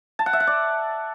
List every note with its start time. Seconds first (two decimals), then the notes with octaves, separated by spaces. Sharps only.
0.19 A5
0.26 F#5
0.33 E5
0.40 F#5
0.47 D5